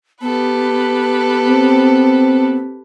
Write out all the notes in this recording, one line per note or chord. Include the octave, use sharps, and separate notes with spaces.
B3 G4 A4 B4
C4